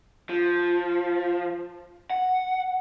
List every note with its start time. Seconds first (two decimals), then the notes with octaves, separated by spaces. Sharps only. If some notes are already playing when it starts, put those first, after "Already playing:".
0.29 F3
2.10 F#5